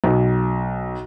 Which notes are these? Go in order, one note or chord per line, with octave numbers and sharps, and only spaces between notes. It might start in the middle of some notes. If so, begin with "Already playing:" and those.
B1